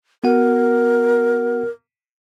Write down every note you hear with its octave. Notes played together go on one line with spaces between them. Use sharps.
B3 F#4 A#4 F#5